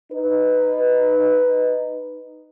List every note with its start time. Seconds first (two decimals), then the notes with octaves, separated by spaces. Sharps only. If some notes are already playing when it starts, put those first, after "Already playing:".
0.13 D#4 B4